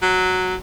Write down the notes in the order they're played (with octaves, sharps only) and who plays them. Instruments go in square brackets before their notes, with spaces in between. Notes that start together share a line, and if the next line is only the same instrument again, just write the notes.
[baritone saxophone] F#3